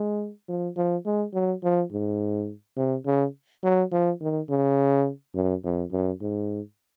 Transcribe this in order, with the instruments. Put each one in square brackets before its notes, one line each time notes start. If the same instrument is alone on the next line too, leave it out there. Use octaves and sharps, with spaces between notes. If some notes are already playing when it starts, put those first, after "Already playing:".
Already playing: [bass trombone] G#3
F3
F3
G#3
F#3
F3
G#2
C3
C#3
F#3
F3
D#3
C#3
F#2
F2
F#2
G#2